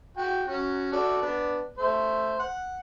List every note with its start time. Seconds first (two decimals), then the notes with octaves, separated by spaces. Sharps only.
0.17 F#4 G5
0.47 C#4 F#4
0.93 F#4 A4 D5
1.22 B3 D4
1.78 A3 C5
2.39 F#5